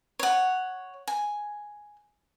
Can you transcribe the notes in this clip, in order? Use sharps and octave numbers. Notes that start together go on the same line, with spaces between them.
C#5 F#5
G#5